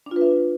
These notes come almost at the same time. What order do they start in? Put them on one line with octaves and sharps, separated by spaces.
D4 F4 B4 E5